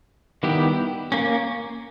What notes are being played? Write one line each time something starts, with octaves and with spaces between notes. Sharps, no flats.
D#3 G3 B3 E4 G4
A#3 C#4